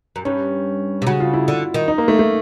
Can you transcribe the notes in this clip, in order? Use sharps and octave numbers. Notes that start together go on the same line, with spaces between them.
F#2
G2 C#4
C3
C#3 F#4
F4
E4
D3
D#3
D#4
A#3
A3
A3